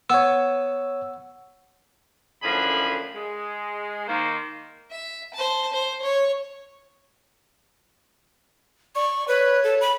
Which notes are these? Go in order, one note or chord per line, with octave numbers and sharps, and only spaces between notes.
B3 C#5 E6
F#2 A2 D3 F3 G#4 B5
G#3
D#3 A#3 C5
E5
C5 A5
C5
C#5
D5 C#6
B4 C#5
A4
B5